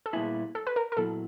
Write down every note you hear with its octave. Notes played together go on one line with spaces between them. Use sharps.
A4
A#2 G3 B3 E4 G#4
A4
B4
A#4
A#4
A#2 F#3 B3 E4 A4